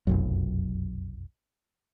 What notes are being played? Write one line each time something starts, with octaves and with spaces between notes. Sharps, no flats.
F1 B1 F#2